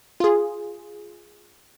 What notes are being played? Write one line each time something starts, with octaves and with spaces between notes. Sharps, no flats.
F4 G#4